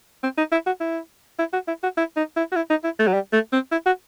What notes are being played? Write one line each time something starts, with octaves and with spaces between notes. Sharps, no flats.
C4
D#4
E4
F#4
E4
E4
F#4
E4
F#4
E4
D#4
E4
F#4
E4
D#4
E4
A3
F#3
G3
A3
C4
E4
F#4